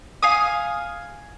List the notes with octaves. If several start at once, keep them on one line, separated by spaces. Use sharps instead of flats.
F5 G#5 D#6